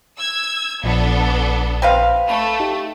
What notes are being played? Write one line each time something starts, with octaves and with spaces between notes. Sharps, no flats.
E6 G#6
A#1 F3 B3 D4 A4 B6
C4 B4 F5
A3 B5
D#4 G4